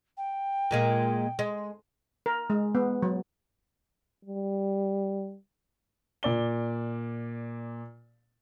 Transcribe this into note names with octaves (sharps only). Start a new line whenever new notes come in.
G5
A#2 G#3 A#3
G#3
A#4
G#3
B3
F#3
G3
A#2 D5 G7